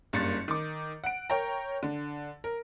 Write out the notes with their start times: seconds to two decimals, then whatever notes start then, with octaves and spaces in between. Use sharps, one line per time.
0.13 F#1 G2 A#3 A6 C#7
0.48 D#3 D6
1.04 F#5 D7
1.30 A#4 C#5 G5 A#5
1.83 D3
2.44 A#4